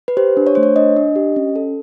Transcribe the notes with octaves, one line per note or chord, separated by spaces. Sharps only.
B4
G4 C5
D4
C#5
A3 C5
C#5
D4 D#5
D4
G4
C#4
A4